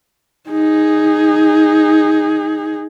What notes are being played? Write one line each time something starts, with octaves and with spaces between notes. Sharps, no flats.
D#4 G#4